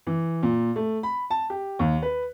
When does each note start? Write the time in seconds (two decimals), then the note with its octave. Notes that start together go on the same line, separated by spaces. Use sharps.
0.07 E3
0.43 A#2
0.76 A3
1.03 B5
1.30 A5
1.50 G4
1.79 D#2
2.02 B4